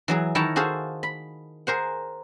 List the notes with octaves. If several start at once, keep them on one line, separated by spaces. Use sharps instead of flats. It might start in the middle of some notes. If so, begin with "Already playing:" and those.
E3 F#3 G#4
D#3 E4 C#5 A5 A#5
F#4 G#4 A4 C5 F5
B5
G#4 A#4 C5 F#5